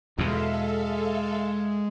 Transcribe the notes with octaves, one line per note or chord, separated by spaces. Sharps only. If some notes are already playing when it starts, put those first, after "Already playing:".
E2 B2 G#3 A4 E5 F5